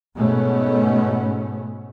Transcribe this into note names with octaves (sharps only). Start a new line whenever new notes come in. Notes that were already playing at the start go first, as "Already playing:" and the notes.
G#2 B2 A3 B3 C#4